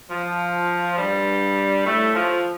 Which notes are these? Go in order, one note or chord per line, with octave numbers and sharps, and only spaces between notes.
F3
G2 G3
A2 A3
F3